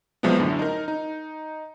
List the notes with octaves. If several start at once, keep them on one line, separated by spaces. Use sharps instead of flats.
C2 F3 F#3 G#3 B3
F#2 A2 D3
D#4 A#4
D#4